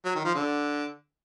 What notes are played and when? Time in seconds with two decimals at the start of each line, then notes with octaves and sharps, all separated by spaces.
0.05 F#3
0.15 D#3
0.25 F3
0.35 D3